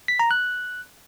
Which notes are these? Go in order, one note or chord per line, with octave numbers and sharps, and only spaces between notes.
B6
A#5
F#6